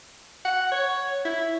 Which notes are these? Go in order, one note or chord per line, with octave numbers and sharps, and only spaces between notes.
F#5
C#5
E4